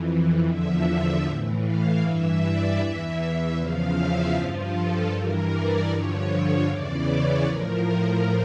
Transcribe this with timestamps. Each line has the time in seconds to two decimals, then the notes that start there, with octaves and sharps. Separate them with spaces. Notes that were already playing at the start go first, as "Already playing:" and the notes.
Already playing: F2 E3
0.46 E2 D3 F3 E5
1.24 A2 E3
1.63 F5
2.01 G2 E3 E5
2.40 D5
2.79 E2 E3 E5
3.56 E2 C#3 F3 F5
3.95 E5
4.34 G2 F3 F4
4.72 A4
5.11 G2 E3 A#4
5.50 D5
5.89 G2 D3 F3 C#5
6.27 C#5
6.66 E2 C#3 E3 D5
7.05 C#5
7.44 A2 F3 A#4